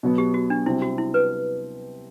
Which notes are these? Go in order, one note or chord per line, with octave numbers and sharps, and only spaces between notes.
B2 F#3 B3
G4
F#4
D4
C3 G3 C4 E4
F#4
E4
B4